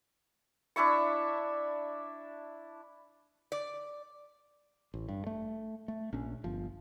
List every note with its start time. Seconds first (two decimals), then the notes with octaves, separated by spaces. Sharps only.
0.76 D4 E4 E5 C#6
3.52 D5
4.94 A1
5.09 G2
5.27 A3
5.88 A3
6.13 A#1 C#4
6.44 G1 F3